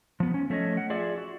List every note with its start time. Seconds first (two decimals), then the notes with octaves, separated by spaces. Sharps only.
0.20 F3 B3
0.34 C#4
0.50 F3 A3 C#4 C#5 D#5
0.77 F#5
0.90 F4 G#4 D5 E5
1.18 F#4